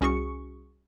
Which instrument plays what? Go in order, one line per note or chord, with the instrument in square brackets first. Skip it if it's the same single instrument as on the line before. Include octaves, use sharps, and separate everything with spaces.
[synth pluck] C2 C#4 F#4 G#4 C#6 C#7